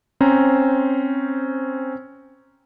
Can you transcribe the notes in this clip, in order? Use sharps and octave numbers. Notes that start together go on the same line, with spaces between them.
C4 C#4 C5 A#5